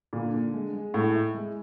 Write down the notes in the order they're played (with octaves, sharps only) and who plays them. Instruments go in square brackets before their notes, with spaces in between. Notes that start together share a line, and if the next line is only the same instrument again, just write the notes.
[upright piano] A#2 [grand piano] D3
[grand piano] D3
G#3
G#3
[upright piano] A2 [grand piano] E4
[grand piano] E4
G#3